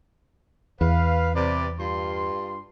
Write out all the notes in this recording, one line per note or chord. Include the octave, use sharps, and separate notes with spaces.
E2 B4 F5
C3 B4 D5
G2 F4 C6